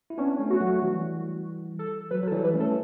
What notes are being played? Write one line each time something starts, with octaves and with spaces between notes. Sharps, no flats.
E4
B3 C#4 D4
A3 C#4
F#4
F#3 A3
E3 G3
A4
F#3 B4
F#3 A4
E3 G3
B4
A3 C#4
A4